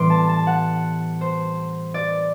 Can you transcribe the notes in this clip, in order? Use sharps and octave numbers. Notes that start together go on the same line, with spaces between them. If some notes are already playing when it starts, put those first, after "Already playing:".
Already playing: A2 E3 G3 B3 C6 D6
A5
A5
F#5
C5
D5